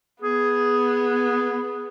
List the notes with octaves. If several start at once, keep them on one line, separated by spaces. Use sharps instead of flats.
B3 G#4